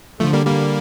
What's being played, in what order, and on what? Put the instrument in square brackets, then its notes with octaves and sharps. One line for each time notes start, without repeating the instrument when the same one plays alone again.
[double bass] D3 [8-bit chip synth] F3 A3
[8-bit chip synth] G3 A#3
G3 A#3